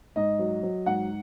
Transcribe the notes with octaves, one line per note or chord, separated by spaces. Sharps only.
G#2 D#5
F#3
F#3
G#2 F#5